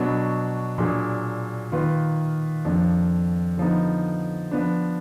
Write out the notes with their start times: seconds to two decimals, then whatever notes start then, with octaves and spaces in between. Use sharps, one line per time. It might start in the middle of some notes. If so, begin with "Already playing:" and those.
Already playing: B2 F#3 B3 D4
0.78 A#2 F#3 D4 G#4
1.72 D#3 A#3 F4 B4
2.65 F2 F3 A#3 D4
3.57 D3 F3 B3 D#4
4.51 F3 B3 D4